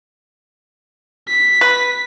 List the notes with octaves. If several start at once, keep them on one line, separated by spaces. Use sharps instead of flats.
B6
B4